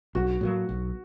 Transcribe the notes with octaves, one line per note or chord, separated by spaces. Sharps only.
B1 F#4
A2 F#3 A#3
B1